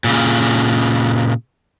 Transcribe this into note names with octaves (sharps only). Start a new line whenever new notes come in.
A#2 C#3